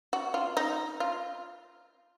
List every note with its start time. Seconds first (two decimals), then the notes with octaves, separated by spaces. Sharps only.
0.13 F#4
0.34 F4
0.57 D#4
1.00 F4